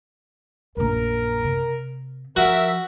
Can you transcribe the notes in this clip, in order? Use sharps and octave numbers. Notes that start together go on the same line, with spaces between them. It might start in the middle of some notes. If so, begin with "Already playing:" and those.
A#1 F#2 A#4
C3
F3 F#4 A#4 E5